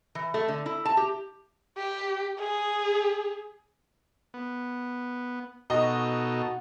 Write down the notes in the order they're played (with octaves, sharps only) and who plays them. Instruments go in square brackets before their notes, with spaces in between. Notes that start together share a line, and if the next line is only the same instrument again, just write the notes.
[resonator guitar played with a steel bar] E3
A3
D3
E4
A5
G4
[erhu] G4
G#4
[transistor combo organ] B3
[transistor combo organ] B2 D#4 A4 [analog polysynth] F#4 [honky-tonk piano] D#5